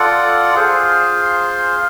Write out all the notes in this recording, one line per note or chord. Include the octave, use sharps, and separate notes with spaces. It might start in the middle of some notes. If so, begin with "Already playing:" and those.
Already playing: F4 A4 D5 F#5
F4 G#4 C5 F5